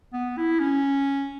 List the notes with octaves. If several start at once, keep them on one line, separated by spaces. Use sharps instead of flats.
B3
E4
C#4